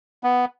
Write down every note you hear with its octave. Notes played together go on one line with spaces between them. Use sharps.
B3